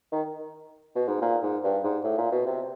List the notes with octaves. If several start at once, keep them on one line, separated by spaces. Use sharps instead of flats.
D#3
B2
G#2
A#2
G#2
G2
G#2
A2
A#2
B2
C3